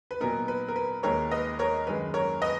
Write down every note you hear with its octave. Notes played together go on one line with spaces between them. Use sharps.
B4
A#2 F#3 B3 D#4 A#4
B4
A#4
B4
D#2 D#3 G#3 D#4 A#4 C#5
B4 D#5
A#4 C#5
F#2 D#3 G#3 B4
A#4 C#5
B4 D#5